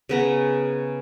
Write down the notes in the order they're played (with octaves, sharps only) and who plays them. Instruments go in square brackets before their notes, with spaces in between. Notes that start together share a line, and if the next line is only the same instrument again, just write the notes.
[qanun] C#3 B3 A#5